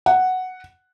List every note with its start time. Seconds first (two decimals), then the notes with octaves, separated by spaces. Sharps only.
0.06 F#5